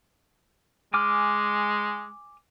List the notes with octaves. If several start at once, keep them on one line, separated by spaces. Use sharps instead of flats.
G#3 G#5 D6 F6